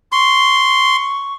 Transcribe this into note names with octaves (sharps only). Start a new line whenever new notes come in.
C6 C#6